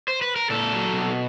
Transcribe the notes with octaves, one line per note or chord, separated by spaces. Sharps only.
C5
B4
A#4
A#2 A4
F#3
B2